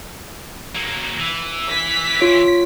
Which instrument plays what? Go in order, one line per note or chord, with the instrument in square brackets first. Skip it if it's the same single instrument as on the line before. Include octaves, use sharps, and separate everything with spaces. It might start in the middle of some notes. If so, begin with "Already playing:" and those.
[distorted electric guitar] F#3 A#3
E3
[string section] B6
[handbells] F4 C#5 D7